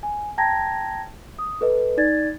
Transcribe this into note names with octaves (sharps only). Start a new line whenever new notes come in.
G#5
G5 A5 A#5 G#6 A#6
D#6
A4 B4 D#5
D#4 D5 G#6 A6